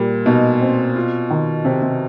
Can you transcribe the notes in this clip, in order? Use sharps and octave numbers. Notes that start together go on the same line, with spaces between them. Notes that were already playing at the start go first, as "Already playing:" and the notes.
Already playing: A#2 G3
B2 D#4
C4
F4
D#3
C3 C4
C3